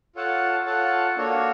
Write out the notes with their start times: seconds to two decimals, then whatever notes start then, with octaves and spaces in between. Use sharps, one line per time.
0.15 F4 A4 C#5 F#5 A5
0.66 F4 A4 C#5 F#5 A5
1.16 A#3 D4 F#4 A4 C#5